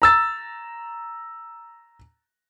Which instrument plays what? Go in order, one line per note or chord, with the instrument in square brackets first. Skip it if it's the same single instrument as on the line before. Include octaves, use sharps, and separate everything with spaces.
[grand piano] A#5 E6 A6